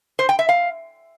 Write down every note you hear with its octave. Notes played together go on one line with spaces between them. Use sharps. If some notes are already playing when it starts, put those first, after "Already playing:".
C5
G5
E5
F5